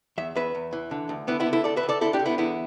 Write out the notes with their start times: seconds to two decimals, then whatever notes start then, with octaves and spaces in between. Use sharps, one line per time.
0.18 E2 E5
0.35 E2 B4 E5
0.55 E2
0.73 E3
0.91 D3
1.09 D2
1.27 D3 B3 E4
1.40 B3 E4
1.46 D3
1.53 E4 A4
1.64 D2 A4 D5
1.77 B4 E5
1.83 D2
1.89 A4 D5
2.01 D3 E4 A4
2.13 D4 G4
2.19 D3
2.26 B3 E4
2.38 E2 B3 E4